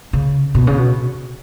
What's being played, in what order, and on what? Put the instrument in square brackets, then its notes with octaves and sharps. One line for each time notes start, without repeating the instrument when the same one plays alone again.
[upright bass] C#3
B2
C#3
B2